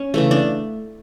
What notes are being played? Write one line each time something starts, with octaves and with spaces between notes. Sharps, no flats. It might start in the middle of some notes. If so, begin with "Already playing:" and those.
Already playing: C#4
C#3 E3 A3
D4